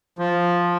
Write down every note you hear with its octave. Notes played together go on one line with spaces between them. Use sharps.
F3